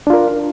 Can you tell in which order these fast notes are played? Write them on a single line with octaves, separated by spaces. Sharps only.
D4 F4 A#4